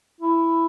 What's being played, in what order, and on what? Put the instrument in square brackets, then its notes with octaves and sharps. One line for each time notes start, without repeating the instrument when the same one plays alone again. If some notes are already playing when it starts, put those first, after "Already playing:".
[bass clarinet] E4